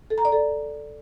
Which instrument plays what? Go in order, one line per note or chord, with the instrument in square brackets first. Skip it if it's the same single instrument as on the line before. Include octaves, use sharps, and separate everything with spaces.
[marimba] A4
A#5
D5
A4